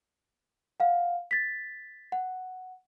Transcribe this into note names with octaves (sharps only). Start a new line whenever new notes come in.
F5 F#5
A6 B6
F#5